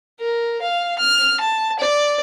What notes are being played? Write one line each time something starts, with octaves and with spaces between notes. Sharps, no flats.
A#4
F5
F6
A5
D5